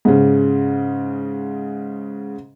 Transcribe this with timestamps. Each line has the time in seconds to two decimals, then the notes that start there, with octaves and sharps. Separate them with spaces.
0.05 G#2 C#3